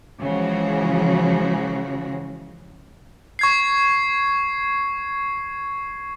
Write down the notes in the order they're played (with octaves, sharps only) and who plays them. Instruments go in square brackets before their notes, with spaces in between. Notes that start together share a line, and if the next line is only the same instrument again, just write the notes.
[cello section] C#3 E3 F3 G#3 F#4 G#4
[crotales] C#6 G#6 C7